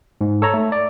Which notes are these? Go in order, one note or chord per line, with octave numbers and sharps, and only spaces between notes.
G#2
A4 C#5 A#5
A3
D5